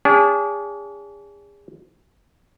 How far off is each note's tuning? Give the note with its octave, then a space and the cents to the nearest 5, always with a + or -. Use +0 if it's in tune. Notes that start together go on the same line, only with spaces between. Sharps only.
D4 -45 G#4 -35